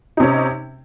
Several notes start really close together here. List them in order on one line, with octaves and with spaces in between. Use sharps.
D#4 C3 C#4